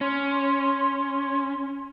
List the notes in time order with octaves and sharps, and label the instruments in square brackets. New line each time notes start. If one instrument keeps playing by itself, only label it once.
[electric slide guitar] C#4 [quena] C6